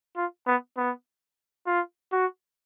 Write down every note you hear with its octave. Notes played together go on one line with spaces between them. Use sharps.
F4
B3
B3
F4
F#4